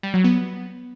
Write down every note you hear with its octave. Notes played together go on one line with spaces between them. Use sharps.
G3
F#3
B3